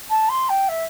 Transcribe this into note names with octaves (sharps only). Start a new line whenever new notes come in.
A5
C6
G5
E5